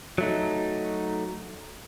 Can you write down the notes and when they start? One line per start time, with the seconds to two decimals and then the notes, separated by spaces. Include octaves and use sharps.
0.18 F#3 A3 D#4